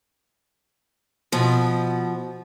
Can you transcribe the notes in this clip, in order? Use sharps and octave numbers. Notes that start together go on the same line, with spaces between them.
B2 F3